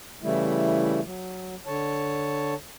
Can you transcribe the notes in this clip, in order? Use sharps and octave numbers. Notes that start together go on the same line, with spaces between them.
C#3 E3 G3 A3 E4
F#3
D3 C#5 A5